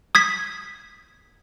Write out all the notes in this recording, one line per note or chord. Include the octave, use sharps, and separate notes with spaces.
D#6 G#6 B6